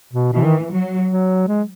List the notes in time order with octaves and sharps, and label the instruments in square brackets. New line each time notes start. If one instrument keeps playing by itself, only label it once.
[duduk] B2
[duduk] B2 [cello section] E3
[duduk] D#3
[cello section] F#3
[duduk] F#3
G#3